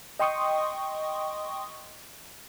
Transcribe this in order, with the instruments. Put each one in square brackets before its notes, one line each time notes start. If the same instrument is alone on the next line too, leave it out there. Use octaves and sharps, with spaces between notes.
[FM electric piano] D#5 G5 C6 C#6 D#6